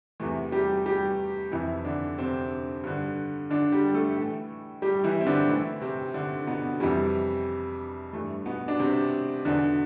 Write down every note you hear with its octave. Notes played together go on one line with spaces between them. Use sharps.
E2 C3 E3 A3
G3 G4
G3 G4
F2 C3 E3 E4
D3 D4
C3 C4
G2 D3
D3 D4
G3 G4
A3 A4
A2 E3
G3 G4
E3 E4
C4
D3 D4
A2 E3 E4
C3 C4
D3 D4
B2 B3
F2 C3 E3 G3
G2 E3 A3
B2 B3
D4
C3 C4
E2 B2 D3 D4